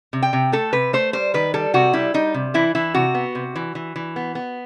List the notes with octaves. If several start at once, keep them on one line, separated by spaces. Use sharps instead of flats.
C3
G5
C3
A3 A4
C3 B4
A3 C5
G3 C5
D#3 B4
G3 A4
C3 F#4
G3 E4
G3 D#4
C3
E3 E4
E3 E4
C3 F#4
B3
C3
E3
E3
E3
B3
B3